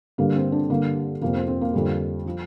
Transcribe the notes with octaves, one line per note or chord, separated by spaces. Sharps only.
G2 D3 G3 A#3
C4
D4
G2 D3 G3 A#3
F2 C3 F3 A#3
C4
C4
A#3
F2 D3 G3
F3